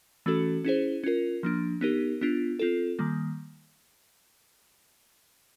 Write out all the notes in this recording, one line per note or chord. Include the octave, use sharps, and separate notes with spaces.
E3 A3 C#4 F#4 A4
C#4 E4 G#4 C5
C#4 F4 A#4
F3 A#3 D4
B3 D#4 G4 A#4
B3 D4 F4
C4 F4 A4
D#3 G3 A#3